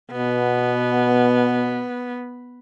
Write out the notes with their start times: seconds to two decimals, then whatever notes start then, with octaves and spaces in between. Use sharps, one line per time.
0.12 B2 B3